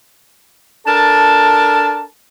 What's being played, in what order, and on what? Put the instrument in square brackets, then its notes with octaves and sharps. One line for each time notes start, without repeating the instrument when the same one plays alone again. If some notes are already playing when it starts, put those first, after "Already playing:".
[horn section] D4 A4 A#4 A5